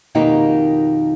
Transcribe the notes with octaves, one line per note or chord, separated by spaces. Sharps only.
F2 B2 D#3 A#3 D#4 G4